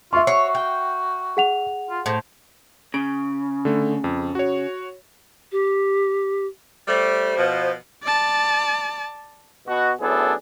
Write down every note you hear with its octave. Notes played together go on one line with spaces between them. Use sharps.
F4 E5 C6 C#6
F#4 C#5 C7
G5
G#4 F#5 F7
F4
A2 C5
C#3 D7
D3 A3
F2
F#4 C#5
G4
G3 A3 C5
B2 F3
D5 A5
B2 F#4
F#2 A2 B3 D4 G#4 A4